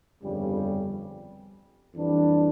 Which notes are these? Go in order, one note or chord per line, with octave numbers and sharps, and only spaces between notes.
G1 F2 C#3 G3
F2 E3 G3 D4